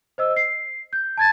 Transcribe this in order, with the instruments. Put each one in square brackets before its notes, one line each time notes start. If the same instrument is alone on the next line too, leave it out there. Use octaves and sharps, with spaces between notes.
[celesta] C5 D#5 E6
C7
G6
A5 G#6 A6